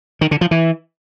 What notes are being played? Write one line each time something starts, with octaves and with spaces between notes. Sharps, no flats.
D#3
D3
F3
E3